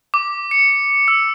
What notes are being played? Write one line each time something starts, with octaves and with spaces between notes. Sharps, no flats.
D6
C#7
E6